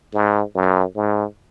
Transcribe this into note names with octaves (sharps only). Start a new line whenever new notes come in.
G#2
F#2
G#2